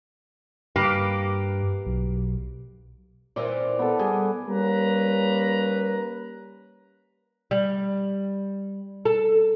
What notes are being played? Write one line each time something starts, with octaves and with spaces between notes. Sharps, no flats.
G2 A#3 G4 B4
B1
A#2 E3 C4 D5
B3 A4
G3 G#4
G3 A#3 C#4 B4 A#5
G3
A4